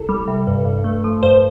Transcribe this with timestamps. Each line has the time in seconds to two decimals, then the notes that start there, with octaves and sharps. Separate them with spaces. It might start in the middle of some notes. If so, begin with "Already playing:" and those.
Already playing: C2 A4
0.09 G3
0.28 C3
0.47 G2
0.65 G2
0.84 A3
1.04 F3
1.23 G2 C5